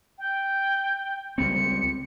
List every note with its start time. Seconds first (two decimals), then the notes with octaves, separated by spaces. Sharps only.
0.18 G5
1.38 C#2 G3 C4 C#7